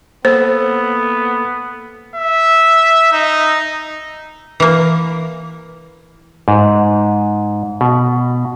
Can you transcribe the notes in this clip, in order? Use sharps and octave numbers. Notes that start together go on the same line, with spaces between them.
A#3 B3 A4 C5 E6
E5
D#4
E3 A#3
G#2
B2